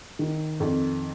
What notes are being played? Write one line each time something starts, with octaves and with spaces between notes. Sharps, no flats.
D#3
F2